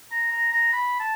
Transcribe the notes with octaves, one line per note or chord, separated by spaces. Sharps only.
A#5
A#5
A#5
B5
A5